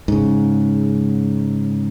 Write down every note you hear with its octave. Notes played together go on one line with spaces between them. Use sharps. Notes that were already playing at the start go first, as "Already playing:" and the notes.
G#2 C#3